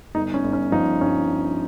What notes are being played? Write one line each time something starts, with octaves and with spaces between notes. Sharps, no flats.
G1 D#4
C#4
G1
C#4
F3 D#4
G2 C#4